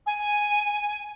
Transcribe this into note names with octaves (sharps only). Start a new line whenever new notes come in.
G#5